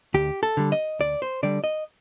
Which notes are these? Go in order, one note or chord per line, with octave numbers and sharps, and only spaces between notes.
D2 G4
A4
D3 G3
D#5
D2 D5
C5
D3 G3 D5
D#5